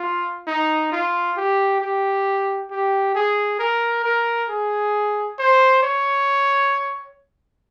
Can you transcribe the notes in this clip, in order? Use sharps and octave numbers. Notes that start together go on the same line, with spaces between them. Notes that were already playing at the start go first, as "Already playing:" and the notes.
Already playing: F4
D#4
F4
G4
G4
G4
G#4
A#4
A#4
G#4
C5
C#5